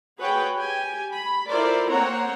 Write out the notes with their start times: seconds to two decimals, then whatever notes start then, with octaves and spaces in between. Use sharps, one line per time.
0.18 F#4 G#4 B4 C#5 F#5 G5
0.55 G4 G5 G#5
1.13 B5
1.48 E4 F4 A4 A#4 C5 D5
1.90 A#3 C4 C#5 F#5 A#5